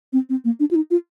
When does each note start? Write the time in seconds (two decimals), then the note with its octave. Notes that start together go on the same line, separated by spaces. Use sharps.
0.13 C4
0.29 C4
0.45 A#3
0.60 D4
0.71 F4
0.75 D#4
0.91 F4